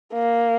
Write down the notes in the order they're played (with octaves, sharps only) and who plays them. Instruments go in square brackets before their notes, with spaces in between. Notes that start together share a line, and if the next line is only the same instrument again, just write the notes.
[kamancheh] A#3